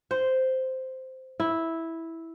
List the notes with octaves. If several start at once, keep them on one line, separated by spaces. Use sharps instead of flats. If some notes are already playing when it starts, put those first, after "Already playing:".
C5
E4